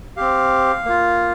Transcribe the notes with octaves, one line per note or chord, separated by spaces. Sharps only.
C4 G4 F5
A#3 F4